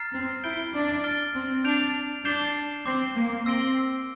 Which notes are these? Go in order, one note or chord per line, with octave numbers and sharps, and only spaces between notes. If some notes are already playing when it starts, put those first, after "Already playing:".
Already playing: A#5 F6 A6 C7
C4
E4 G6 D7 G7
D4
F6 A6 D7 G7
C4
D4 G6 D7 F7
D4 G6 C7 E7 G7
C4 D6 G6 C7 G7
A#3
C4 E6 A#6 D7 G7